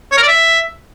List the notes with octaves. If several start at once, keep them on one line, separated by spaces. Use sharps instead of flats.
C#5
A#4
D5
E5